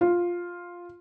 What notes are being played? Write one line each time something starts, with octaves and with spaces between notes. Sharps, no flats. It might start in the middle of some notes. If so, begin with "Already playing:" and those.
F4